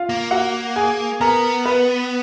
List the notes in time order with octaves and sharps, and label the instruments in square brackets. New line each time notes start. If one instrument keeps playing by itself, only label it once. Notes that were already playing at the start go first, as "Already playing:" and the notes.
Already playing: [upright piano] F4 F5
[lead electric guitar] A#3
[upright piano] F#4 F#5
G#4 G#5
[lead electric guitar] B3 [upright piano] A#4 A#5
[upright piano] B4 B5